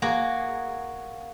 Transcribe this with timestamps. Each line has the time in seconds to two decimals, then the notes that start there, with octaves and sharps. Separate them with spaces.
0.02 A#3 F#4 G#4